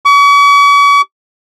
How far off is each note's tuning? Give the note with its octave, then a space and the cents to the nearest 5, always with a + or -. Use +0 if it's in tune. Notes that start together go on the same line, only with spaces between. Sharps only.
C#6 +45